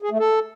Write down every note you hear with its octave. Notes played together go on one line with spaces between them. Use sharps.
G#4
A3
A4